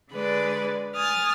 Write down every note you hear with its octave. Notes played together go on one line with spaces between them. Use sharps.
D3 G#3 B4 D5
G#5 D#6 F6 A6